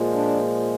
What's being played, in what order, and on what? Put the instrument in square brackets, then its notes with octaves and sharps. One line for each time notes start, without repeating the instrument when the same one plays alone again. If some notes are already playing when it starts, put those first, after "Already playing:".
Already playing: [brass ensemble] A#2 F3 G#3
D4